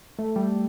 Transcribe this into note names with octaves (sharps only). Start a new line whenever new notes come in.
A3
G3